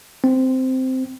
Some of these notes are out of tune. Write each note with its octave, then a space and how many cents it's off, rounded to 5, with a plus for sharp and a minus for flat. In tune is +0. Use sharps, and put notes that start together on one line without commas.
C4 -10